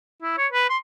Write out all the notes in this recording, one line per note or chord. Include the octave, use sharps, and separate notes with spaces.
E4
C#5
B4
C6